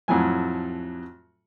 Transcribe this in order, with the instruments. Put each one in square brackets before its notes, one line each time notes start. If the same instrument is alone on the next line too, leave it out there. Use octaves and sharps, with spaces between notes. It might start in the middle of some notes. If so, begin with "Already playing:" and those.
[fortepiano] F2 A2 F#3 G#5